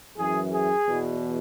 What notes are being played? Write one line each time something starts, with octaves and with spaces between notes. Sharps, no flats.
F#2 E3 G#4
G#4
E2 B2